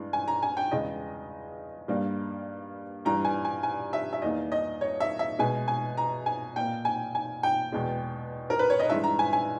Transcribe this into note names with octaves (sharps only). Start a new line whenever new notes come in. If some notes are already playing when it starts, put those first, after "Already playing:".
Already playing: G2 E3 G#3
G#5
A#5
G#5
G5
E2 C#3 G#3 D#5
G2 G3 A#3
G2 E3 G3 A#5
G#5
G#5
G#5
E5
E5
E2 D#3 A#3 D#5
D#5
C#5
E5
E5
B2 G#3 G#5
G#5
A#5
G#5
A#2 A#3 G5
G#5
G#5
G5
E2 B2 G#3
A#4
B4
C#5
D#5
G2 E3 G#3 E5
A#5
G#5
G#5